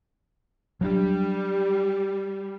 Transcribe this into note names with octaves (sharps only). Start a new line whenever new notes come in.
F#3 G3 D4